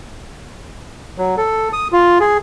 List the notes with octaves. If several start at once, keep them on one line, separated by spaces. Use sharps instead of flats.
F#3
A4
D#6
F4
G#4